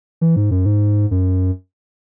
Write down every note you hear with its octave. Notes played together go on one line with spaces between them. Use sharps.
E3
G#2
F#2
G#2
F#2